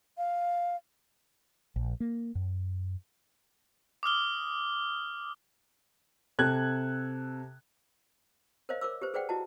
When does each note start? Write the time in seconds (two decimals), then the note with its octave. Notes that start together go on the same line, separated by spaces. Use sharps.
0.18 F5
1.76 A#1
2.00 A#3
2.35 F#2
4.03 D6 D#6 F6 G7
6.39 C3 A4 F#6 G#6
8.69 A#4 C5 C#5 D#5 F5
8.81 A#4 C5 D6 E6
9.02 G4 B4 C5
9.14 G#4 B4 C5 D5 F#5 G5
9.29 E4 F#4 D#5 A5